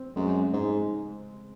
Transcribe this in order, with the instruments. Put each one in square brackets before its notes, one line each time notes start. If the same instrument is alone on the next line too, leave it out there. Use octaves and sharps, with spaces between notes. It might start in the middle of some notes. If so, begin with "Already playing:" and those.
Already playing: [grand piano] C4
[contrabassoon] F#2 [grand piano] G#3
[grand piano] G#3
[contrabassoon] G#2
[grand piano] G#3